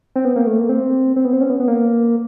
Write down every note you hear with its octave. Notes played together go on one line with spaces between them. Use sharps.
C4
B3
A#3
A3
A#3
C4
C4
B3
C4
C#4
B3
B3
A#3